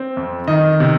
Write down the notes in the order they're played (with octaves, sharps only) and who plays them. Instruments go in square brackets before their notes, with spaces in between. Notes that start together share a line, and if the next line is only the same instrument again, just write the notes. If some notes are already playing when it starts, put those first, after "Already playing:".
Already playing: [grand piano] C4
F2
D#3 D#5
C3